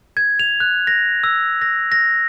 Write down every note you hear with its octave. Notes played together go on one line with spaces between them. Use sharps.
G#6
F7
F#6
A#6
E6
A#6
A#6